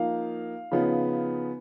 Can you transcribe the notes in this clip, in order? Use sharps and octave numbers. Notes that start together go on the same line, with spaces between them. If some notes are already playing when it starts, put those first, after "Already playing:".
Already playing: F3 A#3 D#4 F5
C#3 F3 B3 D#4